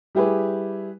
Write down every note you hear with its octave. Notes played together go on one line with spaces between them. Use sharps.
G3 E4 G4 G#4 B4